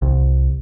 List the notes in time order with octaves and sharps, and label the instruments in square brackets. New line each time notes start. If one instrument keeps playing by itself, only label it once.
[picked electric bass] C2